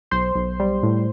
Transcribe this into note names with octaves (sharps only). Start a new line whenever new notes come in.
B1 C5 C6
B1
G3
A2